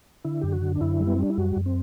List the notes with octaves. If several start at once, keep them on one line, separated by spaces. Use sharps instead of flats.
D3 E4
F#2 G4
F#4
D3
D4
F#2 E4
G3
B3
C4
G3 D4
E4
F#2 F#4
F#2
C4